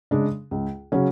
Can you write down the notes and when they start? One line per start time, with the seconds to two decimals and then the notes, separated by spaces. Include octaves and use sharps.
0.11 C#3 G#3 D4
0.51 C#2
0.92 C#3 F#3 C#4